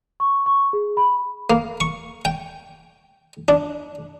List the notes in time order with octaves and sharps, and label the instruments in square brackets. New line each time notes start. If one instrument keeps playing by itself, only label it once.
[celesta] C#6
C#6
G#4
B5
[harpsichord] A#3
C#6
G5
D4